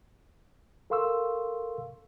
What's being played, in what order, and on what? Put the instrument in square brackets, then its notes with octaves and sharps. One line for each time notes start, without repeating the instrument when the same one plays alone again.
[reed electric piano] A4 A#4 F5 C6 C#6 E6